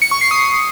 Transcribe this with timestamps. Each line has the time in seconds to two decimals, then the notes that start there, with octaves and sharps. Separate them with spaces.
0.02 C#7
0.11 C#6
0.21 C7
0.31 D#6